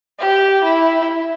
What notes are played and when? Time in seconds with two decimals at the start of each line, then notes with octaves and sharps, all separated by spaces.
0.19 G4
0.63 E4